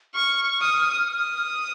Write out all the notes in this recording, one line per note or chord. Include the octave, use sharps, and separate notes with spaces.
C#6 F6
D#6
D#6